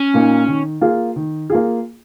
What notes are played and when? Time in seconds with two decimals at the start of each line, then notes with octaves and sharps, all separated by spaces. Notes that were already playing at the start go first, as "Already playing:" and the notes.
Already playing: C#4
0.14 A#2 A#3 D#4
0.48 D#3
0.81 A#3 F4 G#4
1.16 D#3
1.50 A#3 F4 G#4